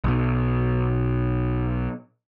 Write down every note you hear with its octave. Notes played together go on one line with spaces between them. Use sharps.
B1 B2